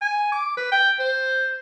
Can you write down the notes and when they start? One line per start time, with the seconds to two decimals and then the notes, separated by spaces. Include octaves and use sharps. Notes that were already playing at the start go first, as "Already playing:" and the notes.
0.02 G#5
0.32 D6
0.57 B4
0.72 G5
0.99 C5